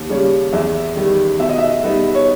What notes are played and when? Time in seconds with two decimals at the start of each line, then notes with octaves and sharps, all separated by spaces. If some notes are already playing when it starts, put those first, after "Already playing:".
Already playing: D#2
0.09 C#3 G3 C#4
0.53 E2 E5
0.96 D#3 G3
1.40 B2 E5
1.49 D#5
1.58 E5
1.84 G3 B3 D#4
2.15 C#5